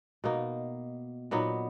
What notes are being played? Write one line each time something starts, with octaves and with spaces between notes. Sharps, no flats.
B2 A#3 D#4
A#2 F#3 B3 D#4